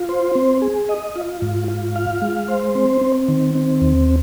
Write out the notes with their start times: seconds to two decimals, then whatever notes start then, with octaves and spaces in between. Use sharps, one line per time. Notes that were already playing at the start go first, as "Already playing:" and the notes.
Already playing: F4
0.09 C5
0.35 C4
0.62 G#4
0.89 D#5
1.16 F4
1.42 G#2
1.68 F4
1.96 F5
2.22 G#3
2.48 C5
2.75 C4
3.01 C4
3.28 D#3
3.55 C4
3.81 D#2